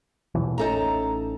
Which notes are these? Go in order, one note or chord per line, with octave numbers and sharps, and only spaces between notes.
D#2 B2 E3
A1 A3 C#4 D#4 A4 A#5